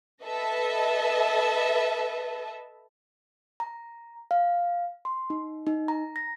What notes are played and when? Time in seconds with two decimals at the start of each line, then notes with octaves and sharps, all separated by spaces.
0.24 A4 B4 D#5 E5 A5
3.60 A#5
4.31 F5
5.05 C6
5.30 D#4
5.67 D#4
5.88 A#5
6.16 A#6